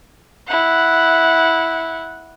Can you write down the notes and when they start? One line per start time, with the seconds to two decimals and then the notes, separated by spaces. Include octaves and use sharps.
0.47 E4 F#5